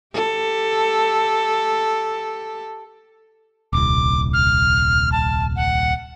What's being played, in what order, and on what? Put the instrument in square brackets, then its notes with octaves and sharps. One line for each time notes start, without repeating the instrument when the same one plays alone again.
[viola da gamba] G4 A4
[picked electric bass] D#1 C2 [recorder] D6
[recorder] F6
A5
F#5